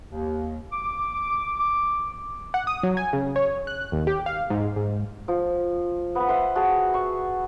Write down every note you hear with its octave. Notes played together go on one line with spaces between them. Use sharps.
D#2
D6
D6
F#5
D#6
F#3
G#5
C#3
C#5
F#6
D#2
G4
F5
G#2
G#2
F3
B3 B4
B4 C5 E5 F#5
F#4 G#4 A5
C#6